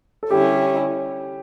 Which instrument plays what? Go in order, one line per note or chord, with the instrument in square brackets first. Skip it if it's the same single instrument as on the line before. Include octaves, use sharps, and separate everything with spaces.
[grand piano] A4
[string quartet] D3 G3 C#4 E4 [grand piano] G4